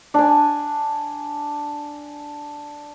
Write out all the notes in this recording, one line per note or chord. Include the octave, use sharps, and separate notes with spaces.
D4 G#5